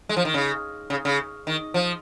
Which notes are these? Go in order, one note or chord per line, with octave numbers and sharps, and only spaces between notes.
G#3
F3
D#3
C#3
C#3
C#3
D#3
F3